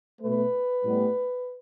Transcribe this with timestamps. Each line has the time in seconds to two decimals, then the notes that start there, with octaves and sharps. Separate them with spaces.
0.20 B2 A3 B4
0.85 A2 G3 B3